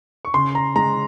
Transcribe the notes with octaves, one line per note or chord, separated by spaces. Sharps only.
C#6
C#3 C6
A#5
G#3 A#5